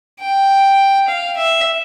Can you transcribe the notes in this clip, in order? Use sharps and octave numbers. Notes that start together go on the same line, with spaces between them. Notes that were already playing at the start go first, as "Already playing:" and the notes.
G5
F5
E5